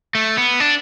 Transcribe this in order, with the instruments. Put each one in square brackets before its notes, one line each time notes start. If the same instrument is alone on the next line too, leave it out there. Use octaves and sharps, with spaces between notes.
[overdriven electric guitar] A3
B3
D4